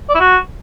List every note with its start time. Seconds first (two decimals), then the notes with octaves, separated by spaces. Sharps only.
0.09 D5
0.15 E4
0.20 F#4